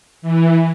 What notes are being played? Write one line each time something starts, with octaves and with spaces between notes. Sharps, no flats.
E3